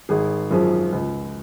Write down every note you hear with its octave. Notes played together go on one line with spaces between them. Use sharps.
G#1 G#4
F#2 F3 G#4
C#2